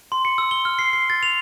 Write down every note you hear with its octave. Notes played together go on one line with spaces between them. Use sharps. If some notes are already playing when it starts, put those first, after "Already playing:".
C6
C#7
E6
G7
F6
C7
C7
A6
F7